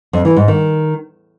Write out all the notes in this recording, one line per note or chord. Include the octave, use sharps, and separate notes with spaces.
F2
E3
G#2
D#3